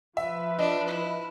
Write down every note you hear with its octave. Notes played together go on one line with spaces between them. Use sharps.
F3 B4 E5
D4 D#5
E4